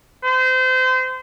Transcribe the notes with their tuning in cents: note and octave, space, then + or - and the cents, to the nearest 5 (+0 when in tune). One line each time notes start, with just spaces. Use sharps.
C5 -30